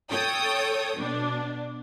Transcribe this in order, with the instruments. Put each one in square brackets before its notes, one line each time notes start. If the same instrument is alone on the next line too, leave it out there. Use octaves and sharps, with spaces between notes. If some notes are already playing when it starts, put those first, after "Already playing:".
[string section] A4 C#5 G5 D#6
B2 D4